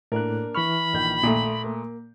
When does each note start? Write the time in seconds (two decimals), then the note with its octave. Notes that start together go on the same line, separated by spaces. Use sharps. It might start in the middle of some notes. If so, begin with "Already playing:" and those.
0.12 A2 A#3 D4 A#4 F#6
0.55 E3 B5 C#6 F6
0.93 A#1 D#3 G6
1.23 A#2 A3 C6 D#6
1.64 A#3